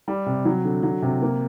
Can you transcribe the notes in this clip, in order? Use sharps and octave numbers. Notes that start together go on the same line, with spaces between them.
G3
C3
F#3
D3
F#3
C3
A#3